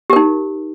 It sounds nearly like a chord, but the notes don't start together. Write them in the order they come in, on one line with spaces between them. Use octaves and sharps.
G4 A#4 D#4